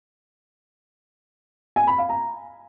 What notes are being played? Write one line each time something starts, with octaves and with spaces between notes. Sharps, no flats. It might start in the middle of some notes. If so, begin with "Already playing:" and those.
G#5
B5
F5
A#5